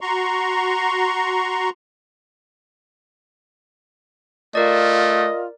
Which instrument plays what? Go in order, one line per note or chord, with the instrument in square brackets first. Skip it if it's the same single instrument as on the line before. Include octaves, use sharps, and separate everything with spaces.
[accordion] F#4 A#5 C6 C#6
[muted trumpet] A3 [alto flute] F4 [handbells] A#4 D5 [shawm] D#5